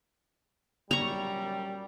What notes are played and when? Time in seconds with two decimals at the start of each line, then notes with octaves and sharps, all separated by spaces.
0.91 F#2 A#2 G3 A#5 C#6